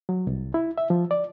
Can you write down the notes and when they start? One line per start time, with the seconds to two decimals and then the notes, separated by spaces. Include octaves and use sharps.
0.09 F#3
0.27 C2
0.54 E4
0.78 E5
0.90 F3
1.11 D5